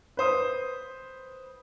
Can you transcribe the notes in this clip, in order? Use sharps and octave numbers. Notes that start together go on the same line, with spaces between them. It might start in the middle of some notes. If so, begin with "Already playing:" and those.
B4 C5 D#6